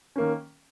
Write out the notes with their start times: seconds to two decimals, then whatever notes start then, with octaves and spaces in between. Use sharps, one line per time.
0.16 D#3 A#3 C#4